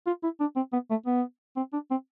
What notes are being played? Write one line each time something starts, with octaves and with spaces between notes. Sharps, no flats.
F4
E4
D4
C4
B3
A3
B3
C4
D4
C4